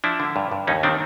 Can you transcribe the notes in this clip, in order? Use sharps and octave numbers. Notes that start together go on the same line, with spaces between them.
F3 D4 E4
D3
G2
G2
D#2 C#4 D#4
D#3 C4 D4